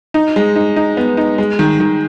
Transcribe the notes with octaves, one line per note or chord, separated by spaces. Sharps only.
D#4
G#3
D#4
D#4
B3
D#4
G#3
D#3
D#3